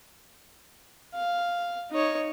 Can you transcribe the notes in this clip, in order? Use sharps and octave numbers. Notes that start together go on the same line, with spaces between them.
F5
D#4 C#5